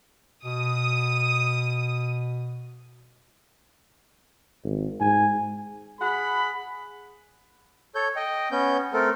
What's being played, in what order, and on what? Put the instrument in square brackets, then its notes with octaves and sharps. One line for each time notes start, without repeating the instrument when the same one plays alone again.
[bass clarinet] B2 [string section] D#6
[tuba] G#1
[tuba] G#2 [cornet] G#5
[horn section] G#4 F#5 B5
[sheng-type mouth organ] A4 C#5 G6
D#5 G5
B3 C#4 G6
A3 C4 A4 A#4